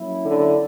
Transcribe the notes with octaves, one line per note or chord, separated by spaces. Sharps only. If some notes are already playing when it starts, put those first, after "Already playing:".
Already playing: F#3 A#3 C#4 E4
D3